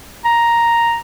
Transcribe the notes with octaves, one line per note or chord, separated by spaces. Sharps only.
A#5